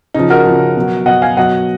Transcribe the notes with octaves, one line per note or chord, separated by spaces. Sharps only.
C#3 F3 D#4
F#4 A#4
C#3 F3
B2 F#3
B2 F#3 D#5 F#5
F5 G#5
B2 F#3 D#5 F#5